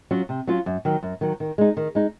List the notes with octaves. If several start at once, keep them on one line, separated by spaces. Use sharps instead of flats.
F#3 C#4 F4
C3
F#3 C#4 F4
F#2
D#3 F#3
F#2
D#3 F#3
D#3
G#3 D#4
D#3
G#3 D#4